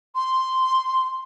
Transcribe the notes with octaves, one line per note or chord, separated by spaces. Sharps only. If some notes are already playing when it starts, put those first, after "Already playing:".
C6